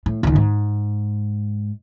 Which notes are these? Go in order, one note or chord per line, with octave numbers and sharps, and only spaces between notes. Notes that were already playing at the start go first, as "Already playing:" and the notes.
A2
C#2 D#3
G#2